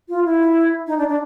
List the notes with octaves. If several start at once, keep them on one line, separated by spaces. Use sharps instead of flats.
F4
E4
D#4
D4
D4